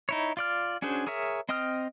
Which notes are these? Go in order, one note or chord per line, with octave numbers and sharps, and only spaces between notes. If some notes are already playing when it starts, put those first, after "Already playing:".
D#4 E4 C#5
F4 D5 F6
C#4 D4 F#4 G#4 C5
G#4 A#4 C#5 E5
C4 D#5 G5 D#6 F6